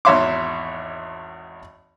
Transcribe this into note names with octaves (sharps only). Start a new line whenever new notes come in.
G#1 E2 C#5 E5 C6 D6